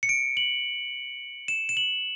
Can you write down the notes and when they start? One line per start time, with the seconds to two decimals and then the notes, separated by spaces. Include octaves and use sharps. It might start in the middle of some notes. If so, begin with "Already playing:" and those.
0.03 C#7
0.09 D7
0.37 F#7
1.48 E7
1.69 E7
1.77 F#7